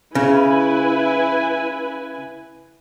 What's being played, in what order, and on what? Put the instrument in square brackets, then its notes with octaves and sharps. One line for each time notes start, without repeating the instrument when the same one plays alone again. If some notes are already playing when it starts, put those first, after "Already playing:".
[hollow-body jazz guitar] C#3 [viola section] E4 B4 G#5